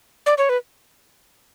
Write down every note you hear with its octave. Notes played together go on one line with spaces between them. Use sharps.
D5
C#5
B4